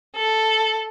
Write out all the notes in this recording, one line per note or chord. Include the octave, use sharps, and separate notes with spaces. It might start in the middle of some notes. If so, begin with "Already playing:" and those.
A4